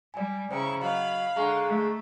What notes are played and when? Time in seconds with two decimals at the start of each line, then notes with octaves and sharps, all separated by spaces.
0.14 G3 D5 G#5
0.51 C#3 E4 C5 G5 A#5 C#6
0.81 F#3 D#5 F5 B5
1.36 D3 G#3 A#5 C#6
1.66 A3